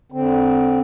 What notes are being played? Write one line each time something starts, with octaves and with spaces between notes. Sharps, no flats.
D3 C4